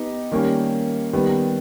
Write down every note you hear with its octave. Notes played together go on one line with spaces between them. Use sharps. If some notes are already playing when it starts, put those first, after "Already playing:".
Already playing: B3 D#4 G4
D#3 G3 A#3 C#4
D#3 G3 B3